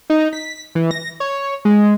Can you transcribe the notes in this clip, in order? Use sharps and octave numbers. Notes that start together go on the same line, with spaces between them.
D#4
B6
E3
A#6
C#5
G#3